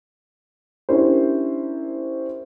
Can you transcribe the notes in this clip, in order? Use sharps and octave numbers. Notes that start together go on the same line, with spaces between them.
C#4 D4 E4 G4 A#4 C5